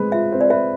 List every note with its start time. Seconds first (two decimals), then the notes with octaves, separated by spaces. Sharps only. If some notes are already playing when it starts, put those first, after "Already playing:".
Already playing: G#3 C4 B4
0.12 F4 E5
0.32 C4
0.41 D5
0.50 B4 E5